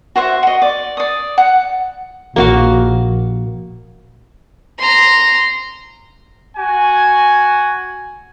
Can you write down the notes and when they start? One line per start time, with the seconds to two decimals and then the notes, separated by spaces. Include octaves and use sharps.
0.16 F#4 C5 E5
0.43 F#4 D#5
0.62 D5
0.97 D5 D#6
1.38 F#5
2.36 A#1 A#3 F#4 F5
4.78 A#5 C6
6.56 F#4 G#5